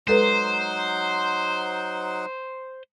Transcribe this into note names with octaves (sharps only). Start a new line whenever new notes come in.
F#3 G#3 D#4 A4 B4 C5 F#5